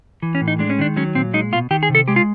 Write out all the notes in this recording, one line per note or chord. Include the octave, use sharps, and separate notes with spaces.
E3
C#4
A2
D#4
G#3 D4
C#4
D#3 D4
F#3 C#4
A#2 C4
G#3 D#4
B2 F4
D#3 G4
G#4
C3
A4
G#3 G4
F4